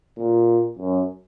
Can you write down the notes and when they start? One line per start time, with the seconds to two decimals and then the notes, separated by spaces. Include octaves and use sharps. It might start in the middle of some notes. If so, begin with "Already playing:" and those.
0.18 A#2
0.79 F#2